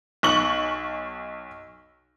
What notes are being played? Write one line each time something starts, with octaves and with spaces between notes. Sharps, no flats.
B1 C#6 F#7